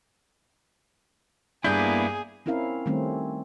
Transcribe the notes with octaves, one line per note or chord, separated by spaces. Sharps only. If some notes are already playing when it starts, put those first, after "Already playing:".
G2 A#3 B3 D4 E4 G#4 G6
C4 C#4 E4 A#4 F5
D#3 G3 A3 C4 C#4